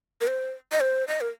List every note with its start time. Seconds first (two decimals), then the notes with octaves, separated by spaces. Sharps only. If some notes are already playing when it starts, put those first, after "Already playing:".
0.21 A#4
0.27 C5
0.72 D#5
0.80 C5
1.08 D#5
1.21 A#4